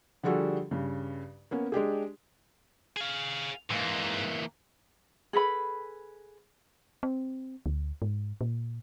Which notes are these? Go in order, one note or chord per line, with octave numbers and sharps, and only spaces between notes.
D3 F3 G3 F#4 G#4 A4
G2 C#3
A#3 B3 C#4
G#3 D4 G4 G#4
G#4 F5
G#2 E3 A#3
G#4 A4 B4 B5
C4
D2
G#2
A#2